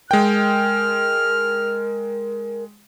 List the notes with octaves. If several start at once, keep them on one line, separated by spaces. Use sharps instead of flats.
G#3 A#4 G5 F6